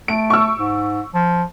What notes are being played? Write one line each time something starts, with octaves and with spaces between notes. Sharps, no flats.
A3 D7
C#6 E6
G#2
F3